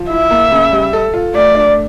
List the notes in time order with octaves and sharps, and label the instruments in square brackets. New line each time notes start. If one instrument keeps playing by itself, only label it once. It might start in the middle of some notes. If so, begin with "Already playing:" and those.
Already playing: [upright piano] F3
[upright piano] E4 [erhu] E5
[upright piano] A#3
C#3
G3
A4
F4
[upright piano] A3 [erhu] D5
[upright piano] D4